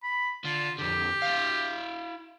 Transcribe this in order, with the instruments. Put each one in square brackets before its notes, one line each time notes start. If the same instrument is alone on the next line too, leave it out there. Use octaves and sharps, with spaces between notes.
[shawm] B5
[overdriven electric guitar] D3 [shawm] F4
[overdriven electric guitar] F2 D3 [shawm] G4
[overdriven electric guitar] E4 F5